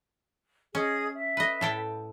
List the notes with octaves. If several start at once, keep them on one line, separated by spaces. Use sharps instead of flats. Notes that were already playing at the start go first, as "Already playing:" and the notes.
C#4 G#4 D#5 D#6
E5
B4 D#5
A2 A4 G5